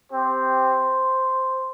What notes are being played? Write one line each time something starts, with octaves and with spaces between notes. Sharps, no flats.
C4 G4 C5